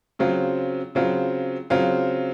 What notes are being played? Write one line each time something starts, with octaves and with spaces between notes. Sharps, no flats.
C#3 F#3 C4 F4
C#3 F#3 C4 F4
C#3 F#3 C4 F4